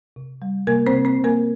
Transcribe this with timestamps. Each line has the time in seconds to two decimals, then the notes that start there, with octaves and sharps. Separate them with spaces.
0.16 C3
0.42 G3
0.67 C3 A#3 A#4
0.87 C4 C5
0.92 C3
1.05 C4 C5
1.18 C3
1.24 A#3 A#4